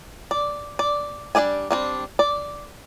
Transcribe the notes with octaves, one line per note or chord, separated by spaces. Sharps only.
D5
D5
G3 D4 A#4 D5 G#5
G3 C4 D4
D5